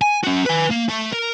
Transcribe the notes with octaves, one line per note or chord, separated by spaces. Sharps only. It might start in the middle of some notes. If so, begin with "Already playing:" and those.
G#5
C#4 F#4
B4 G#5
A#3
A3
A#4